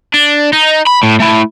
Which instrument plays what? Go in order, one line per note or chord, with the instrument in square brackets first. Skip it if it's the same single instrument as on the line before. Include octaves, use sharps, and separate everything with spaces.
[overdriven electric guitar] D4
D#4
B5
A2
A3 E4